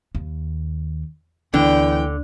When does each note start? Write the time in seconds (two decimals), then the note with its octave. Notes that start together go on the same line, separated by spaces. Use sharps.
0.15 D#2
1.54 D2 D3 E3 B3 D4 G5